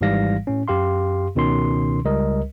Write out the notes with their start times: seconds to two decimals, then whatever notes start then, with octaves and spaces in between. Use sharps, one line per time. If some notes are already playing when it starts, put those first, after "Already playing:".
0.01 G#1 G#2 E3 G3 F5 A#6
0.47 A2 C#4
0.68 F#2 G4 F5 C6
1.35 C#2 B2 D#3 C#4 C6
2.05 C#2 G3 A#4 D#5